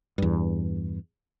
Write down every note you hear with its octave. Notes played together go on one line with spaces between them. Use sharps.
E2 G2